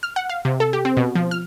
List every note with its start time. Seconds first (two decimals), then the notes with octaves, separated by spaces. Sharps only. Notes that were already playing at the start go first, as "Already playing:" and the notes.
0.03 F6
0.16 F#5
0.29 F5
0.45 C3
0.60 A4
0.73 G4
0.85 C4
0.97 B2
1.15 F3
1.31 F6